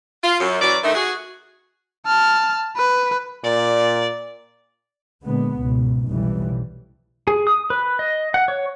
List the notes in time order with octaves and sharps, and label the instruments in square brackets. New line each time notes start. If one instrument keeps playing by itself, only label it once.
[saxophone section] F4
F#2
E3 F#3 C#4 D5
D3 D#3 A3
F#4 G#4
[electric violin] A5 F6
B4
[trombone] A#2 [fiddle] D5
[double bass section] A#2 D3 G#3 B3
C#2 G#2 B2
F1 B1 F2 C#3 E3 G3
[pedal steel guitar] G#4
D#6
B4
D#5
F#5
C#5